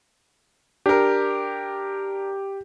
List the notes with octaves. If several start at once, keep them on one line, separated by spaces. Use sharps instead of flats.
D4 G4 A#4